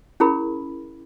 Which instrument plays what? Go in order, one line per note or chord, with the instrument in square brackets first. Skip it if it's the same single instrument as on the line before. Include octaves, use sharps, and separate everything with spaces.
[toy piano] C#4 E4 G#4 A#4 B5